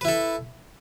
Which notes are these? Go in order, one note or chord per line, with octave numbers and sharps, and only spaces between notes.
E4 A4 B4